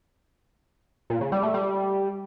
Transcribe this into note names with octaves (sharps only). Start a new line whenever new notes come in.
A#2
C#3
G3
A3
G3